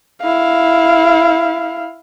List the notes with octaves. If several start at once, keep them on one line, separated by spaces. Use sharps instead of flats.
E4 F5